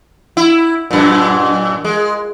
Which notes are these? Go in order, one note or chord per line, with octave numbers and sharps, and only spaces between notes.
E4
F#2 A#2
G#3